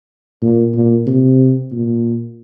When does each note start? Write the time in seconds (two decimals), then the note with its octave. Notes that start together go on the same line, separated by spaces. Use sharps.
0.42 A#2
0.75 A#2
1.07 C3
1.72 A#2